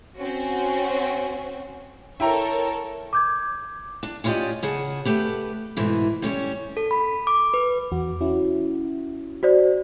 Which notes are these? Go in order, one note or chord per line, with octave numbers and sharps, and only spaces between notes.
C4 C#4 F#4
E4 A4 A#4 C#5 G5 A#5
D6 G6 G#6
D4
C#4 E4 F4 G4 D5 D#5
C#3 G#4 F#5 A5
A3 G4 B4
G#2 B2 E3 A3
G3 C#4 A#4 C#5
A4
B5
D6
B4
E2 F#4
C#4 E4 F#4
F#4 C5 D5